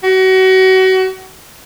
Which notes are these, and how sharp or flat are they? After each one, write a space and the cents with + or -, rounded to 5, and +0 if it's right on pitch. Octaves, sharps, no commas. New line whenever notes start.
F#4 +30